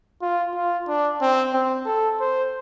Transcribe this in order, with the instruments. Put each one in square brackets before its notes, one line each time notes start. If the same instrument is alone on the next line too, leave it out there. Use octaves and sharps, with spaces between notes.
[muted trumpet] F4
F4
D4
C4
C4
A4
C5